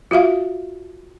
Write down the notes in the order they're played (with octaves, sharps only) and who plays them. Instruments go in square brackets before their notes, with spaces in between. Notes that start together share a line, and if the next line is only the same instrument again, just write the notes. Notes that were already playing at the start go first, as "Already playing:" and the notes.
[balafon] F4 F#4 E5 F5